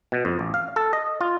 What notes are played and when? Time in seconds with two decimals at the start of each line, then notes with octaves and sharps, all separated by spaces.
0.12 B2
0.25 F2
0.39 A1
0.54 F5
0.76 A4
0.93 D#5
1.21 F4